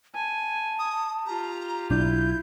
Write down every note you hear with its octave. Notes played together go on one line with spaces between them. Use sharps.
G#5 A5
D#6
F4 G4 A#5
B1 D4 E4 G6